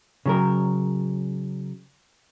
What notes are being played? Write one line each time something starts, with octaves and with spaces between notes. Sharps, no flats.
C#3 F#3 A#4